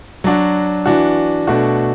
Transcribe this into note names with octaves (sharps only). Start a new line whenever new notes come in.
F#3 D4 F#4
E3 D4 F#4
B2 A3 D4 F#4